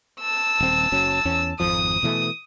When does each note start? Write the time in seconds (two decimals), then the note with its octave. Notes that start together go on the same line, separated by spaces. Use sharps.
0.21 A5 E6
0.60 D#1 C4
0.92 F#1 F#3 C#4
1.25 E2 C#4
1.60 G#1 F2 F3 D#6
2.03 B2 E3 A3